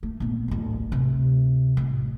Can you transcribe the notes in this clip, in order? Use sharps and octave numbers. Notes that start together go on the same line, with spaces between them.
A3
A#1 B3
D1 A1
D2 C3
A1